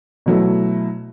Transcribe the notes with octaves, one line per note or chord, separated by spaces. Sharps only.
B2 F#3 A3 E4